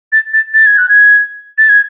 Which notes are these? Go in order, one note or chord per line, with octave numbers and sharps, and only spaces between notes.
A6
A6
A6
G#6
F#6
G#6
A6
G#6